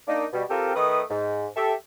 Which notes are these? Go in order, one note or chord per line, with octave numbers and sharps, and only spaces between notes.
A#3 D4 D#4
B2 G3
C4 F4 G4 A4 A#4
D#3 A3 B4 D#6
G#2
G4 A4 E5